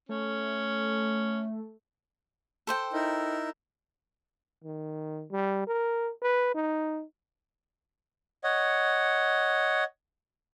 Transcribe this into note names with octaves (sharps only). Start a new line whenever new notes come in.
A3 C#4
A4 C5 G5
D#4 E4 A#4
D#3
G3
A#4
B4
D#4
C#5 D#5 F#5